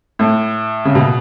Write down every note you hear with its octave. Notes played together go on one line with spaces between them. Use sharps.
A2
C#3
B2